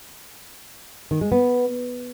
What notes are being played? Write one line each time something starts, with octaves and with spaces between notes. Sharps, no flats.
D#3
G#3
B3